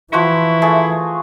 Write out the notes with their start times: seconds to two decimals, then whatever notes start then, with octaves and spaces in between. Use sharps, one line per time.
0.13 E3 F3 E4 F#4 C#5
0.62 A3 G#4